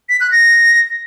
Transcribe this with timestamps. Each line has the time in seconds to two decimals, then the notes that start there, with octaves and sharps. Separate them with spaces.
0.09 B6
0.21 F#6
0.32 A#6